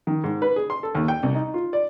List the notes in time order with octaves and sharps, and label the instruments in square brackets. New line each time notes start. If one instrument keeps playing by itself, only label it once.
[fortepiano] D#3
G#2
B4
G#4
C6
A4
D#2
G5
C2
D#4
F4
D5